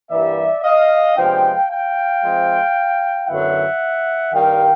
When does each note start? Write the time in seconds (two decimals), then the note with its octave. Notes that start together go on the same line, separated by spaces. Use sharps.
0.11 G2 E3 G3 A#3 D5 E5
0.63 D#5 F5
1.16 C3 F3 G#3 B3 D4 F5 G5
1.69 F5 G5
2.22 F3 G#3 C4
3.28 F#2 D3 F#3 B3 E4 E5 F#5
4.34 G2 D#3 G3 F5 G5